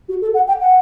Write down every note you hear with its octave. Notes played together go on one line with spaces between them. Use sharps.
F#4
A4
F#5
G5
F#5